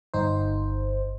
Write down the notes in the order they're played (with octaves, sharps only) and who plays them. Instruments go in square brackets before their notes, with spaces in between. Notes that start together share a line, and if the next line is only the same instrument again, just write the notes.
[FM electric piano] G1 D#4 C5